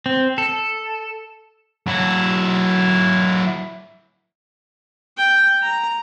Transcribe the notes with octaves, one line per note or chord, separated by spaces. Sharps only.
C4
A4
F#3 E4
G5
A#5